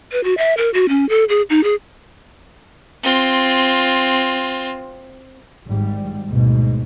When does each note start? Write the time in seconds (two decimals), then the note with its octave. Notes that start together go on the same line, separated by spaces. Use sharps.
0.12 B4
0.24 F#4
0.38 E5
0.57 A#4
0.74 F#4
0.89 C#4
1.09 A4
1.29 G#4
1.50 D#4
1.64 G#4
3.03 C4 F4
5.68 G#1 G#2 G3
6.28 D2 G#2 B2